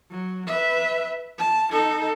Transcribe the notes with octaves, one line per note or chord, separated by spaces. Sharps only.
F#3
B4 E5
A5
D#4 A4